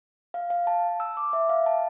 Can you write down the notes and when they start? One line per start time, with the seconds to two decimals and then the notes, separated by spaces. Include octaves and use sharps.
0.34 F5
0.50 F5
0.67 A5
1.00 E6
1.17 D6
1.33 E5
1.49 F5
1.66 A5